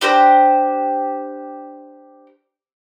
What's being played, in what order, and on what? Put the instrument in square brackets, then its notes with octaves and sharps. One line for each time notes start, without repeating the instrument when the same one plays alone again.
[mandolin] D4 G4 C5 A#5